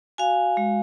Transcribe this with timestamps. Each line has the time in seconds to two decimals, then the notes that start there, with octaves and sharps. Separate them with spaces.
0.18 F#4 F5 G#5
0.57 G#3